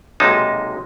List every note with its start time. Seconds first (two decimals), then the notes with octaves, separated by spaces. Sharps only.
0.20 B1 C3 G#3 A#3 D#4 A5